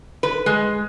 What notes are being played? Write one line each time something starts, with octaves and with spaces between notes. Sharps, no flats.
B4
G#3